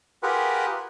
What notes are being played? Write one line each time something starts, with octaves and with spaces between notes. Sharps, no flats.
F4 G4 G#4 A#4 B4 F#5